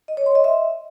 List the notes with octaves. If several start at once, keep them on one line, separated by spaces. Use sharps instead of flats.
D#5
C#5
C6
D#5
E5